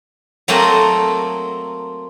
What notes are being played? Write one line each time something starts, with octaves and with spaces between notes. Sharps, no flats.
F#3 A3 A#3 C4 A4 D#5